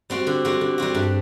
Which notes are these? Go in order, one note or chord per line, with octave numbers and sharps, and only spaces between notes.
G3 C4 F#4
D3
G3 C4 F#4
D3
G3 C4 F#4
G2